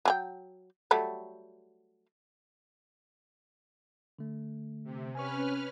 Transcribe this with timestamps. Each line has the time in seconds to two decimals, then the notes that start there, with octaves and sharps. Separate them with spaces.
0.05 F#3 G#4 G5
0.91 F#3 G3 A3
4.19 D3 A3
4.84 C3
5.15 C#4 B4 G#5 C#6 F6